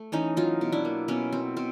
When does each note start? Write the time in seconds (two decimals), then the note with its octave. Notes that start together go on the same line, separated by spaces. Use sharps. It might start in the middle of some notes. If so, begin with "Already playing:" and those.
Already playing: A3
0.12 E3 C#4 D#4
0.37 F#3 D#4 F4
0.61 B2
0.72 D4 E4
0.85 A#3
1.08 B2 B3 C#4
1.33 F#3 C4
1.56 B2 C4